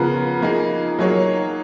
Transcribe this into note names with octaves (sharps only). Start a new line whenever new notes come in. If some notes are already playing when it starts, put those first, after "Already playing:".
Already playing: C#3 F3 B3 F4 A#4
F3 A#3 D#4 G#4
F#3 A#3 D#4 G#4 C#5